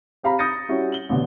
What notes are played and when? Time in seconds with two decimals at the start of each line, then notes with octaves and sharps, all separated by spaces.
0.23 C4 G4 F5 A#5 B5
0.39 D#6 G6 A6 A#6 C#7 D#7
0.69 G3 C#4 E4 F#4
0.92 F#7 G7
1.09 A1 B2 D3